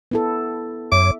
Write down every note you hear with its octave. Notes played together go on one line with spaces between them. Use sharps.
B3 E4 A4
F#2 C#5 E5 D6